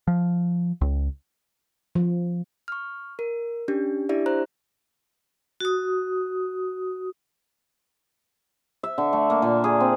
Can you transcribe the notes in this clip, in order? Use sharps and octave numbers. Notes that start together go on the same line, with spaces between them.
F3
C#2
F3
C#6 F6
A#4
C#4 D4 G4
D4 E4 G4 D5 E5
C5 A#5 F#6
F#4 D#6
E5
D3
A3
A#3
A#2
G#4
C4